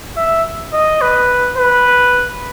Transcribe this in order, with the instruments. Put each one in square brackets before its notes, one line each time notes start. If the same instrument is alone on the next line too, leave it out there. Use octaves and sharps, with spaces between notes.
[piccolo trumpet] E5
D#5
B4
B4